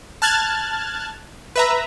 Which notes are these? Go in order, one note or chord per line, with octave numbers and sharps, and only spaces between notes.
A5 F6 F#6 G#6 A6
B4 E5 A#5